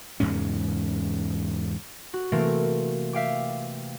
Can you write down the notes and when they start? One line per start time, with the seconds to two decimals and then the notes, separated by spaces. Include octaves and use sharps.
0.20 E2 G#2 C#3 C#4
2.14 F#4
2.32 C3 E3 A3 A#3 C4 A#4
3.13 E5 F5 G5 D6